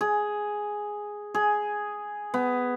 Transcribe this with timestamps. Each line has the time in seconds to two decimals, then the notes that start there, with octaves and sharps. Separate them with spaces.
0.01 G#4
1.35 G#4
2.34 B3